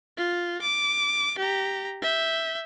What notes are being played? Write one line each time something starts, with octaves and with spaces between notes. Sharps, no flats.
F4
D6
G4 A#5
E5 G6